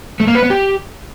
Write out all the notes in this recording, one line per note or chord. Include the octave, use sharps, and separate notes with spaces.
A3
A#3
B4
B3
G4